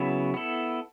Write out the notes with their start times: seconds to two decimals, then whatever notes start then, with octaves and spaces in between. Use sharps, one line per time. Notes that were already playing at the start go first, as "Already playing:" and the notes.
Already playing: C#3 F#3 B3 E4
0.34 B3 E4 A4